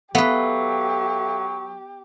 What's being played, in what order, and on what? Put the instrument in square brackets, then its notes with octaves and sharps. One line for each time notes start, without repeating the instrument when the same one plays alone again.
[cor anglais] F#3 [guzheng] B3 B4 [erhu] G4 [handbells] A4 E5 F5